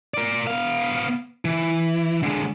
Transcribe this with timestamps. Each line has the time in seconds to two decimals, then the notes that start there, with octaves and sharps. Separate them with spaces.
0.14 A#4 D5
0.47 B3 F5
1.45 E3
2.23 D3 G#3